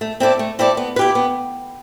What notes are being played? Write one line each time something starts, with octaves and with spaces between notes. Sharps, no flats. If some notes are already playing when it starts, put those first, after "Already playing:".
A3
C4 E4 A4 D5
A3
C4 E4 A4 D5
B3
B4
E4 G4
B3